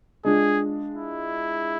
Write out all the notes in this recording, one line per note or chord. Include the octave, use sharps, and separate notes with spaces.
G#3 D4 F4 G#4
E4